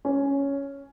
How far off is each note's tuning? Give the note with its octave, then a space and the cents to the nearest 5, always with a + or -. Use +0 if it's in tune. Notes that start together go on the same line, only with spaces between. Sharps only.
C#4 +5